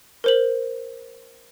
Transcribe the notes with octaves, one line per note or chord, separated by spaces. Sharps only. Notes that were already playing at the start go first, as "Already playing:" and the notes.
A#4 C5 F#7